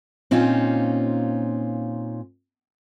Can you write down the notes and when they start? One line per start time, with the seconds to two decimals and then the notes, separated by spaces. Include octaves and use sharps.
0.31 A#2 C4 C#4 D#4 F4